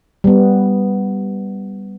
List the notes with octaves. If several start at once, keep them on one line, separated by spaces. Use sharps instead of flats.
G3 B3